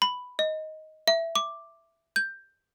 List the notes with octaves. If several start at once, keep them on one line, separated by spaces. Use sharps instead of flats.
B5
D#5
E5
D6
G6